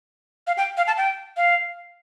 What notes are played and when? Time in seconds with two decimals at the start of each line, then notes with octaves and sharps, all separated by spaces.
0.47 F5
0.57 G5
0.77 F5
0.87 A5
0.97 G5
1.37 F5